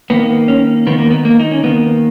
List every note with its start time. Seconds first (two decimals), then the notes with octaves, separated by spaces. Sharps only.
0.10 D#3 A#3 B3
0.48 C#4
0.87 D#3 A#3 B3
0.99 A#3
1.11 B3
1.25 A#3
1.39 D#4
1.51 C#4
1.63 D#3 A#3 B3